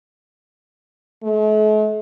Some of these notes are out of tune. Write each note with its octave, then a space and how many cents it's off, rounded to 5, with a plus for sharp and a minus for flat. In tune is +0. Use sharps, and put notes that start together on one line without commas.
A3 -45